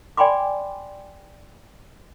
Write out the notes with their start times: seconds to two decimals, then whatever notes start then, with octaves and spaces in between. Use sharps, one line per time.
0.17 D5 G5 G#5 B5 C6 D6